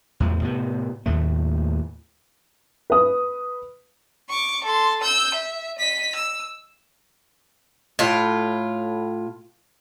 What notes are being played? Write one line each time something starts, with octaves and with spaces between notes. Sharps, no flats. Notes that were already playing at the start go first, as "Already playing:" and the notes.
E2 A2 F3
A2 C3 B3
D#2 A2 A3
B4 D#6
C#6 D6
A4 C6
E6 G6
E5
D#5 B6
E6
A2 F4